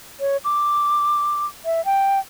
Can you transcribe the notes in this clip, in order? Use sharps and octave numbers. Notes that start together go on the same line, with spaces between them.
C#5
D6
E5
G5